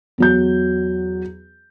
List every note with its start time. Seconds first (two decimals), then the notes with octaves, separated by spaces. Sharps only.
0.18 E2 F#3 G6